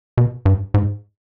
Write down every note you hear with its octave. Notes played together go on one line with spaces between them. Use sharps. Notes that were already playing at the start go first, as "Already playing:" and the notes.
B2
G2
G#2